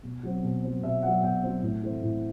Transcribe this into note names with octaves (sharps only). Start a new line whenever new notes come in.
B2
F#3 C4
B2
F#3 C4
B2 E5
F#3 C4 F#5
B2 G5
F#3 C4
A2
E3 A3 C4
A2